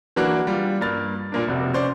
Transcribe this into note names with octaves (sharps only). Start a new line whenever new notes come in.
E3 F#3 A#3 D4 F#4
G3 F4
G2 A#3 F6 A6
A#2 A#3 D4
F1 C3 F#4 D5
C#4 C5 D5